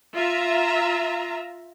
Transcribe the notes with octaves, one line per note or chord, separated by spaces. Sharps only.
F4 E5 A#5